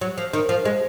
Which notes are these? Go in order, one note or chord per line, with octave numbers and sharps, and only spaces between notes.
F#3
F3
D#3
F3
G#3